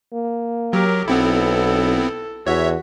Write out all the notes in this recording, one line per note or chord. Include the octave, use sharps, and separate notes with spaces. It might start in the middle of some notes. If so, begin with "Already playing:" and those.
A#3
F#3 G4 A#4
B1 B3 C4 E4 A4
E2 F#4 C#5 E5